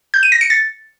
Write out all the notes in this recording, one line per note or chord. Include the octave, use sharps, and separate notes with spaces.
G6
D#7
A#6
C#7
A6